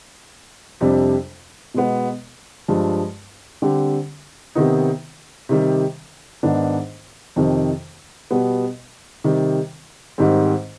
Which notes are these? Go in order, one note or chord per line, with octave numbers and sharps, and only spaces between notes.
F2 C3 G3 D4
B2 G#3 B3
G2 F3 G#3
D3 G3 C4 G4
C3 D#3 B3 D#4
C3 D#3 G3
G#2 D#3 B3 D4
F2 C3 D#3
B2 G3 B3
C3 D#3 G3
G#2 D#3 G3 C4